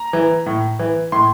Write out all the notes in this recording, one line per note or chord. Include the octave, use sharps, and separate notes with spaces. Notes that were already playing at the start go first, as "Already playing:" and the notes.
Already playing: A#5
E3
A2
E3
A2 C6